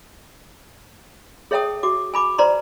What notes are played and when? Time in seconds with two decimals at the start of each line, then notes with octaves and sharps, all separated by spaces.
1.51 G#4 C#5 E5 G5 A5 D#6
1.83 F#4 D6
2.14 G#5 B5 D6
2.38 B4 C5 D5 A#5 C6